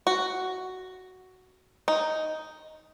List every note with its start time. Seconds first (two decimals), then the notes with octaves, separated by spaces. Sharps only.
0.07 F#4
1.88 D#4